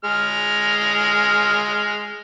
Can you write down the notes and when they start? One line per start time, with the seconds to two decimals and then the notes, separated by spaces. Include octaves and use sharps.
0.04 G#3 F6